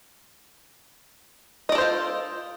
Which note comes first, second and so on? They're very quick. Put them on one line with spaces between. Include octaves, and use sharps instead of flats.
D#5 D5 A4 C5 F4